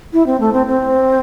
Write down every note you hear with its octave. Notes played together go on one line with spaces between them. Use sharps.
E4
C4
A3
C4
C4